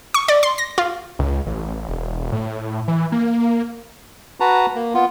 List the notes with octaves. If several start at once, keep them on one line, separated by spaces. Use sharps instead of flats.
C#6
D5
C6
A#6
F4
C#2
A1
E1
A2
E3
A#3
F#4 B4 A5 A#5
A#3
B3 F4